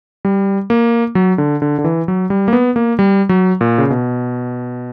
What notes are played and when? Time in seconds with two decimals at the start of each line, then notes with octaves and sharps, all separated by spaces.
0.25 G3
0.70 A#3
1.15 F#3
1.38 D3
1.62 D3
1.79 D3
1.84 E3
2.08 F#3
2.30 G3
2.48 A#3
2.53 B3
2.76 A#3
2.99 G3
3.29 F#3
3.61 A#2
3.78 C#3
3.90 B2